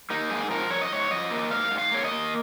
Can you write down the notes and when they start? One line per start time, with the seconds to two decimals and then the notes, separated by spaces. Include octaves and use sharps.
0.10 A#3 D#4
0.30 G#2 G#4
0.50 F3 A#4
0.70 F3 C#5
0.81 D#5
0.91 G#2 C#5
1.11 F3 D#5
1.31 A#3
1.51 G#2 F5
1.71 G#2
1.78 F5
1.91 A#3 C#5
2.04 D#5
2.11 A#3